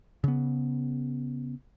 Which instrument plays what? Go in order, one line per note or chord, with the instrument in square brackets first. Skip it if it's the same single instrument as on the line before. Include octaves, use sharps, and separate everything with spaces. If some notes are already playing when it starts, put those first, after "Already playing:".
[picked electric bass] C#3 B3